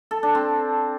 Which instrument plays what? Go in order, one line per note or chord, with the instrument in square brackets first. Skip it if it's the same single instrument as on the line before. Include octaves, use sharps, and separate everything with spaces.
[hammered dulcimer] A4
D4
C4